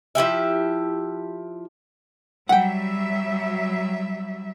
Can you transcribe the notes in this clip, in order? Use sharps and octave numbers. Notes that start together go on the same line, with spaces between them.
F3 E4 G4 E5
F#3 G3 E5 F#5 G5